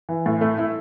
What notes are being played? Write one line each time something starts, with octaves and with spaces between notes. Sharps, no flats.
E3
A2
A3
E4